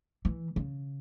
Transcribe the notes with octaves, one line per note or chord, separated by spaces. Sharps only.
E3
C#3